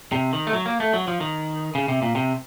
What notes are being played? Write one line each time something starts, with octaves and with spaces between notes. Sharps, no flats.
C3
D#3
A3
F#3
A#3
A3
F#3
F3
D#3
C#3
C3
A#2
C3